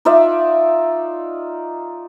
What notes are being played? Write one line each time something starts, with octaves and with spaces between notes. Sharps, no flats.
D#4 F4 D5 E5